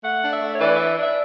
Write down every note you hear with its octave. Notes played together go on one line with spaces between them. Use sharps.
A3 F#5
D4
E5
A3
C#5
E3 D5
D4 E5
D4 E5